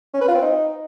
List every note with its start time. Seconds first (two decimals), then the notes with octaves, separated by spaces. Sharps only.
0.14 C#4
0.21 B4
0.28 F4
0.35 C4
0.42 D#4